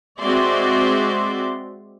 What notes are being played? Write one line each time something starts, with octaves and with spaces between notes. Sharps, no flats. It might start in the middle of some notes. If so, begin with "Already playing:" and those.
G#3 C4 F#4 D5 E5 C6